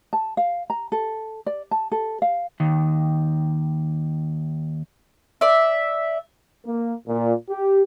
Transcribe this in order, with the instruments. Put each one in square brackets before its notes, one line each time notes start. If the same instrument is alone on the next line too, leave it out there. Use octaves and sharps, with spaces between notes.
[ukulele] A5
F5
A#5
A4
D5
A5
A4
F5
[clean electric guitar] D#2 D#3
[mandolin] D5 E5
[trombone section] A#3
A#2
G4